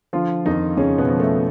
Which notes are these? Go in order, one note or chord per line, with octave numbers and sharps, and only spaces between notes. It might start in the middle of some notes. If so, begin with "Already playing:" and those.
D3 F3 F4
F2 D#3 D#4
F2 C#3 C#4
B2 B3
F3
A3